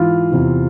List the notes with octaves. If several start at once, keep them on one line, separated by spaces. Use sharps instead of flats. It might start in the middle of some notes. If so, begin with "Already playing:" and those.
Already playing: G#2 E3 F4
E2 C3 E3